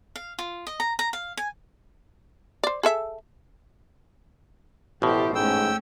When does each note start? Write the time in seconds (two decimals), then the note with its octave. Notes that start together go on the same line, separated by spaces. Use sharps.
0.16 F5
0.39 F4
0.67 D#5
0.80 A#5
0.99 A#5
1.13 F5
1.37 G#5
2.64 C5 D5
2.83 G#4 A4 E5
5.02 A1 B2 E4 G4 A4 C5
5.35 G#2 A3 C#4 G5 E6